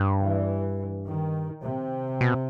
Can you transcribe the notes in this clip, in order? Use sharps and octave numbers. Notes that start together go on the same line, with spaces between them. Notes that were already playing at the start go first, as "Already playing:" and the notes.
Already playing: G2
E3
D#3
C3
B2